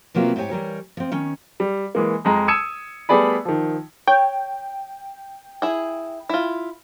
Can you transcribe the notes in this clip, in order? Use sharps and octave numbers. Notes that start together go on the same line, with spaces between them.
C3 F#3 A#3 B3 F4
G#2 E4 G4 C#5 G#5
E3 G3 A#4 C#5
F3 C4
D#3 C#4
G3
E3 G#3 A#3
F2 G#3 A#5
D#6 E6 G#6 C#7 D#7 E7
G3 A3 B3 G#4 D5 B5
D#3 F3
C#5 G5
E4 G#4
E4 F4